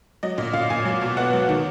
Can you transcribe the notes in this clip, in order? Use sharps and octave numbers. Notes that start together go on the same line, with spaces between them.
F#3 D#5
A#2 D#5
A#2 F5
A#2 G#5
F#3
B2
B3 F#5
F#3
D#3